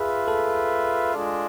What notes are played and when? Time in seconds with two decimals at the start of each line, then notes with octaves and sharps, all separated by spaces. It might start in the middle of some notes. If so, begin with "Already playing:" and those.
Already playing: F4 G#4 B4 E5
0.28 A4
1.14 G#3 D4 F4